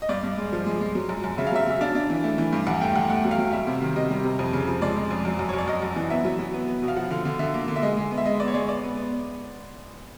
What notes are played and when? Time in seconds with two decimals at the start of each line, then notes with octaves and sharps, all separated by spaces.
0.02 D#5
0.09 G2 D5
0.23 G2
0.38 G#3
0.53 F3
0.66 G#3
0.81 G#3
0.95 F#3
1.09 F#2
1.24 F#2
1.38 C#3 E5
1.47 F5
1.52 F#3 E5
1.67 F#3 E5
1.81 D4 F5
1.95 D4
2.10 E3
2.24 A3
2.38 E3
2.53 G2
2.67 E2 F#5
2.81 A3 G5
2.95 E2 F#5
3.10 A3 F#5
3.25 F#3
3.31 F5
3.38 F#3
3.53 G3 E5
3.67 C3
3.82 D#3
3.96 C3 D#5
4.10 G3
4.24 C3
4.39 F2
4.53 C#3
4.67 F3
4.81 G#3 D5
4.96 G#3
5.10 F2
5.25 F#2
5.39 F#2
5.49 C#5
5.53 F#2 D5
5.68 F#2 D#5
5.82 F#2
5.96 E3
6.10 B3 E5
6.25 F#3
6.39 F#3
6.54 B3
6.67 B3
6.82 B2
6.88 F5
6.96 F3 F#5
7.10 D3 F5
7.25 D3
7.39 D3 E5
7.54 A#3
7.68 D3
7.76 E5
7.82 G#3 D#5
7.97 G#3
8.11 B3
8.18 E5
8.25 G#3 D#5
8.40 B3 D5
8.47 C#5
8.54 G#3 D5
8.68 B3 D5
8.83 B3
8.97 B3